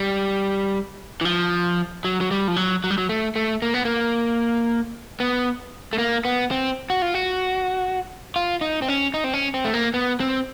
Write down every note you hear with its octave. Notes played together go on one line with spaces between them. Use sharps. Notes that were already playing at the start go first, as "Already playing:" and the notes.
Already playing: G3
E3
F3
F#3
F#3
G3
F3
F#3
F#3
G3
F#3
A3
A3
A#3
B3
A#3
B3
A3
A#3
B3
C4
F#4
F4
F#4
F4
D#4
C4
C#4
D#4
C4
C#4
C4
A3
A#3
B3
C4